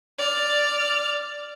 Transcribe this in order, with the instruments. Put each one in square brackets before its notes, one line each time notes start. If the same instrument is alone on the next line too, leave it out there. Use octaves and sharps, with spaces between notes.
[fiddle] D5 F6